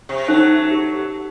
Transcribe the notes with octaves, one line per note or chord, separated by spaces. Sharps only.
C3
F#3 A3 C#4 D#4 C5
G4